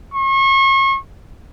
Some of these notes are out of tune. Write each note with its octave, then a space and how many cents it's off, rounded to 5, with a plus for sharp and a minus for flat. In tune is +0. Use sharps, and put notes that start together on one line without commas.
C#6 -35